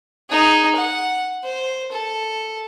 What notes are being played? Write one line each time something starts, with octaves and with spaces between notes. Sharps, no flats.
D#4 G#4
F#5
C5
A4